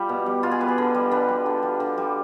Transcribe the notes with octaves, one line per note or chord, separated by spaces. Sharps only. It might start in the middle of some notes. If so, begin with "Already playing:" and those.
Already playing: G3 F4 G4
B2
G3
B2 F4
G#4
G3 B4
G#4
D3
G3
D3 B4
G3
D3
G3
D3
G3